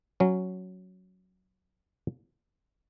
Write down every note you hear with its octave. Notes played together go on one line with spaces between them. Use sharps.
F#3 C#4